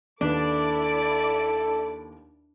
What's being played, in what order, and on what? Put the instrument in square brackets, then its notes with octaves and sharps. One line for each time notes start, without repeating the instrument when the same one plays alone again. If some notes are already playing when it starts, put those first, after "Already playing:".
[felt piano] D#2 B4 [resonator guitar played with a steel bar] D4 [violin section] E4 D5 D6 [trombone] A4